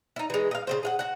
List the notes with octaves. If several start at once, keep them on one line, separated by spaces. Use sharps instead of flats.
D#4 E4
E3 G#3
D#5 F5
C#3 F#3 C5
G#4 F5 F#5
F#4 F#5